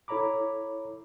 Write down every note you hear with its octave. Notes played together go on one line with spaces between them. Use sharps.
E4 A4 C#5 A#5 B5 D6